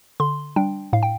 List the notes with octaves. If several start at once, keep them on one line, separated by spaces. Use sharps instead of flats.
D3 C6
G3 D4 G5
A2 F5
G5